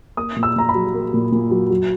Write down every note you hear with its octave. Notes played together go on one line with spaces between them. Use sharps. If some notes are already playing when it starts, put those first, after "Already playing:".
A#3 D#6
A#2
E6
A#2 A#5
B5
F#3
A#3
A#2
A#2
F#3
F#3